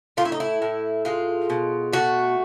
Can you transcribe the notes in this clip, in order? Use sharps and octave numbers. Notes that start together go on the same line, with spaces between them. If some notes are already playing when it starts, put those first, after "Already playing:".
A2 F4
E4
D#4
E4
A2
G#3 F4
B2
A3 F#4